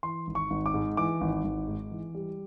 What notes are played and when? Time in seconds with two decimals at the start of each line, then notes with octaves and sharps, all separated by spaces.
0.03 E3 C6
0.27 G#1
0.35 C#6
0.50 G#1
0.66 D6
0.74 G#2
0.97 E3 D6
1.21 G#1
1.44 G#1
1.68 G#2
1.91 E3
2.15 G3